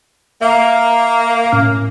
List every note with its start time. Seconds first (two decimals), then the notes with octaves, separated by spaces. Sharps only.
0.41 A#3 E5 F5
1.52 A2 C#4 F6